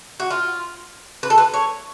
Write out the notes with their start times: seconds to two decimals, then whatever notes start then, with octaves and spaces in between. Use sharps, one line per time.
0.20 F#4
0.31 F4
1.23 B4
1.30 A4
1.38 B4
1.54 C#5